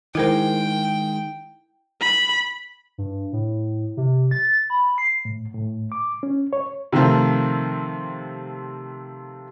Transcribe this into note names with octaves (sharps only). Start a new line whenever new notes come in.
D#3 G#3 E4 A#4 C5 G5
B5
G2
A2
C3
A6
B5
C7
A2
A2
D6
C#4
C#5
C3 D#3 F3 A3 C4